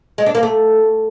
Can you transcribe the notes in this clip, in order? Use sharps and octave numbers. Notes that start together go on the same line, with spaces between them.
G#3
D4
A#3
A3